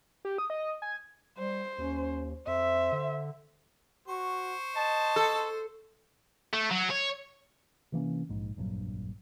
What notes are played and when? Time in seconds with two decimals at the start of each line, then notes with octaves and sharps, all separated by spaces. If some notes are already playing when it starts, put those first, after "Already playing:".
0.25 G4
0.38 D#6
0.50 D#5
0.82 G#5
1.39 G3 C5
1.78 D#2 C#4
2.47 F2 C5 E5
2.92 D3
4.08 F#4 C5 C#6
4.76 D#5 A5
5.16 A4
6.53 A3
6.71 F#3
6.90 C#5
7.92 C3 E3 A#3 C#4
8.29 A#1 G#2
8.57 F1 A#1 G2 F#3